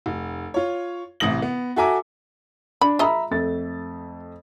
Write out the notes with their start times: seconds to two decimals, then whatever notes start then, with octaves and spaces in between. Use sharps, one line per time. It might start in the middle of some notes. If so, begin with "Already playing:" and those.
0.06 F1
0.54 F4 C#5
1.20 A1 C3 E3 D#6 A#6 F#7
1.42 B3
1.76 F#4 A4 E5 G#5 A#5 D6
2.81 D4 B5
2.99 G#3 F4 D#5 E5 A#5 B5
3.31 F2 A3 A6